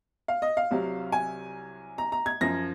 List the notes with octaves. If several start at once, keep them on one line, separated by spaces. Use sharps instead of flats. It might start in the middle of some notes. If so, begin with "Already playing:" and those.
F5
D#5
F5
C2 C3 F#3
G#5
A#5
A#5
G#6
F#2 F3 A#6